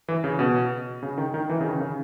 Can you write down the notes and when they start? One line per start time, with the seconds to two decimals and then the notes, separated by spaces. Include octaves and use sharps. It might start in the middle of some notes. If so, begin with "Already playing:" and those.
0.08 E3
0.24 C#3
0.39 B2
1.03 C#3
1.18 D#3
1.34 D#3
1.50 E3
1.61 C#3
1.65 D#3
1.81 C#3